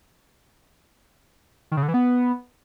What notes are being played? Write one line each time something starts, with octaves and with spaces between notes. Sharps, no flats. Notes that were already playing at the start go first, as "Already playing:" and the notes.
D#3
C#3
D3
E3
B3